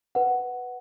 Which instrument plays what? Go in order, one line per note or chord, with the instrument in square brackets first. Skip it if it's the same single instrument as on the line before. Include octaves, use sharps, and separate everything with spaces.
[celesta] B4 F#5